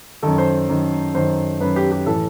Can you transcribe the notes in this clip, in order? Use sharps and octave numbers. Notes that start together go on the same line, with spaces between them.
F#2 D#3 A4
C5
F#2 D#3
F#2 D#3 C5
F#2 D#3 B4
G4
G4
A2 E3 A4